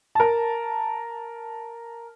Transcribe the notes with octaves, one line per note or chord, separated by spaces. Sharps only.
A#4 A5